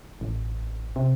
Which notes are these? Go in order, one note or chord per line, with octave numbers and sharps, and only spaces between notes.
A1
C3